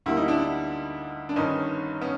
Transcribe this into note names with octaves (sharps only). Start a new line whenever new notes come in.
D2 D3 G3 A#3 E4
D#4
D4 E4
D4
G1 G2 D#3 C#4 D#4
B3 C#4